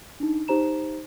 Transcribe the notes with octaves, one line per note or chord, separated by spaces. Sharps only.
D4 D#4
D#4 G4 C5 A#5 E7